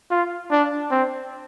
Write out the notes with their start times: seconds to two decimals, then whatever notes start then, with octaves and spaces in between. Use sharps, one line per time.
0.11 F4
0.51 D4
0.91 C4